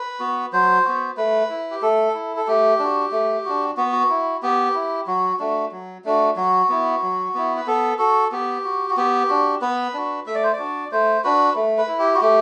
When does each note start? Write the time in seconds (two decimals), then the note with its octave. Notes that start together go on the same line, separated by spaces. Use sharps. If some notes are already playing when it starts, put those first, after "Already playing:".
Already playing: B4
0.20 B3 F#4
0.53 F#3 C5
0.85 B3 F#4
1.17 A3 B4
1.49 E4
1.71 G4
1.82 A3 A4
2.14 E4
2.36 A4
2.47 A3 G4
2.79 D4 F#4
3.12 A3
3.45 D4 F#4
3.77 B3 F#4
3.92 F#4
4.09 E4
4.43 B3 G4
4.75 E4
5.07 F#3 F#4
5.39 A3 D4 F#4
5.72 F#3
6.05 A3 D4 F#4
6.36 F#3 F#4
6.69 B3 E4
7.02 F#3
7.34 B3 E4
7.57 B4
7.67 B3 A4
7.98 F#4 A4
8.32 B3 G4
8.64 F#4
8.90 F#4
8.97 B3 G4
9.29 D4 F#4
9.61 B3 B4
9.94 D4 F#4
10.26 A3 E5
10.35 D5
10.43 C5
10.53 D5
10.59 D4 F#4
10.92 A3 C5
11.24 D4 F#4 B4
11.56 A3
11.78 B4
11.88 E4
11.99 G4
12.15 F#4
12.20 A3 G4